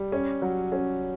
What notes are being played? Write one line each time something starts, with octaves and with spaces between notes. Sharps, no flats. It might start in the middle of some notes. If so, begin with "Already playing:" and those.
Already playing: G3
C#4
F#3
C#4